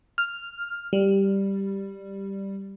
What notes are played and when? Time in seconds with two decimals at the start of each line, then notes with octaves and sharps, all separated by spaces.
0.18 F6
0.93 G3